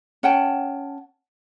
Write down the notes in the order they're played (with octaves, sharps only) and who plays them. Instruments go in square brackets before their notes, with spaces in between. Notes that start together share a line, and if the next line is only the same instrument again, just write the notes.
[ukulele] C#4 F#5 G5 A5